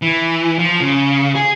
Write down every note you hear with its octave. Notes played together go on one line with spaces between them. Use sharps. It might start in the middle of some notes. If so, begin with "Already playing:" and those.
E3
F3
C#3
G#4